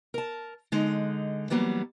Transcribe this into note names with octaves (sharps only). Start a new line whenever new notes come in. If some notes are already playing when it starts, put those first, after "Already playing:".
A#4 A5
D3 G#3 D#4
E3 F#3 G3 A#3 B3